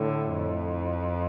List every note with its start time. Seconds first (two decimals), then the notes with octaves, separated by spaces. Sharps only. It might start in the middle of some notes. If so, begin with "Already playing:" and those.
Already playing: A2 D3
0.31 F2